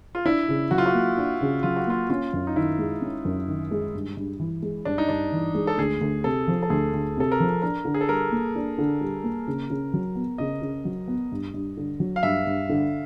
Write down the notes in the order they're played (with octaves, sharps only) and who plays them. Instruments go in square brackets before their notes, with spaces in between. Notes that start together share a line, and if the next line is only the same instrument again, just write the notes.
[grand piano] F4
[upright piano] D4 [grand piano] E4
[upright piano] C#3
[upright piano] F#3 [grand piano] F#4
[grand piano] F4
F#4
[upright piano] A#3
D4
C#3
[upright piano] F#3 [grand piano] F4
[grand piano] F#4
[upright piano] A#3 [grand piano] F4
[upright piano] C#4 [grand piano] F4
[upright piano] F#2
[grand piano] D#4
[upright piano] D#3 [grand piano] E4
[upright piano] G#3
C#4
F#2
D#3
G#3
G2
G2
E3
G#3
[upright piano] G2 [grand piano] D4
[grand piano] D#4
[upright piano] G2 [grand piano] D4
[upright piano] E3
G#3
[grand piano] A4
[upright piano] D2 [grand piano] G#4
[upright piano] D2
[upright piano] C3 [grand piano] A4
[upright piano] F3
[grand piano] A4
[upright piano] D2 [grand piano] G#4
[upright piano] D2
[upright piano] C3 [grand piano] A4
[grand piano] A#4
[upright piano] F3
[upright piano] D4 [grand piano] A#4
[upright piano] D3
[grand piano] G#4
A4
[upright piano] G3 [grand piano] A#4
[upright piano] A#3
D4
D3
G3
A#3
C#3
C#3
F#3
B3
[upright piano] C#3 [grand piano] D#5
[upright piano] C#3
F#3
B3
G2
G2
D3
F#3
[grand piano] F5
[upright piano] G2 [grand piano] E5
[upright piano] G2
D3